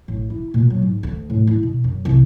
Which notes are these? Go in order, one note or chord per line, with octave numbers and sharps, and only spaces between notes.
A1
E4
A#2
F#3
G#2
D2
A2
E4
B2
F#2
C2